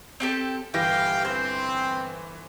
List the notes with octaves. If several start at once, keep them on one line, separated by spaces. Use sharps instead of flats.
C4 G4 A4
G1 E3 G4 F5 G5 A#6
C4 C5